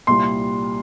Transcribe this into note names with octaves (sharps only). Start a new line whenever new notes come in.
C2 A#2 G3 C6